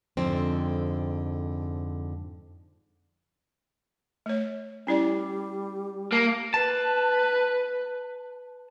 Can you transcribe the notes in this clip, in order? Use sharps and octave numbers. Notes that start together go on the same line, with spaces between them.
F2 G#2 D3 C4
A3 C#5
G3 C#4 E4 D5
A#3 A5
B4 A5